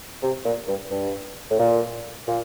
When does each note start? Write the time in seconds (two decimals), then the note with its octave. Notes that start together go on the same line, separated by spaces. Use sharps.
0.23 C3
0.45 A#2
0.68 G2
0.91 G2
1.50 A2
1.59 A#2
2.28 A#2